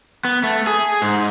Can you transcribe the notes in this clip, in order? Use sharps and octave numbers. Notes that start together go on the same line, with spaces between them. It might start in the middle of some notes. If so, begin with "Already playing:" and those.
B3
A3
G#4
G#2